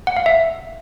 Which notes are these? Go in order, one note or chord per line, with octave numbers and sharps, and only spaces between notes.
F#5
F5
E5